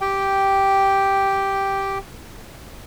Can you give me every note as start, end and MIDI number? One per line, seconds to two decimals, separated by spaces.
0.01 1.98 67
0.01 1.98 79